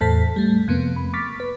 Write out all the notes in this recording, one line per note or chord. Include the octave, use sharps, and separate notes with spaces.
E2 A2 A4 C5 A5 B6
G3 A3
F2 C3 A#3 B3
B5
C#6 D6 F6 A6 B6
B4